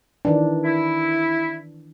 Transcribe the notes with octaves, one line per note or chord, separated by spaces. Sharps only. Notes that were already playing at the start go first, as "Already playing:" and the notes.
D#3 E3 D4
E4